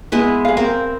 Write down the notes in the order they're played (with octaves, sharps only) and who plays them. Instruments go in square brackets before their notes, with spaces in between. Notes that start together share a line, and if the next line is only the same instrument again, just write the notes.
[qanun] G#3 B3 E4
[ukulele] G#4 F5
[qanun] C4 A#4 [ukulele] F5